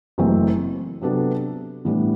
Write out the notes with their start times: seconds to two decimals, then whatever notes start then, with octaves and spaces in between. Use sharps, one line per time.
0.18 F#1 F#2 E3 A3 C4
1.02 C3 F#3 B3 D4 A4
1.85 A2 E3 G3 B3 D4